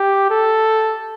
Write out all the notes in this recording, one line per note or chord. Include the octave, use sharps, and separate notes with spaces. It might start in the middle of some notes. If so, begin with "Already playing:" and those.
Already playing: G4
A4